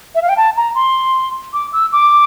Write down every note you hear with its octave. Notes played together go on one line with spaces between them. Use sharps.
E5
F5
G5
A5
A#5
C6
D6
E6
D6